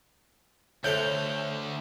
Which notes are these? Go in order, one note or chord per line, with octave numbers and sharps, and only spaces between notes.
D2 A4 C5 C#5 E5 F5 G6